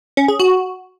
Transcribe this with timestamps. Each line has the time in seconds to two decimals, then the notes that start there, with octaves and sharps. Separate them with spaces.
0.17 C#4
0.28 G#4
0.40 F#4